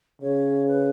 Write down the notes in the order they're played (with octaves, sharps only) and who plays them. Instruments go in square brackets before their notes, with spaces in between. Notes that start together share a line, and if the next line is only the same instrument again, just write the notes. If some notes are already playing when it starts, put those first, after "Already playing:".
[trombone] C#3 [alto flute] C#5
[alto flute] B4